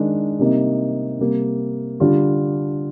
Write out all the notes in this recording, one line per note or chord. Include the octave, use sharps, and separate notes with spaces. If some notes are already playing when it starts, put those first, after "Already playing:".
Already playing: D#3 G#3 D4 A#4
C3 G3 A#3 D#4
C3 G3 A#3
D3 G3 D4 F4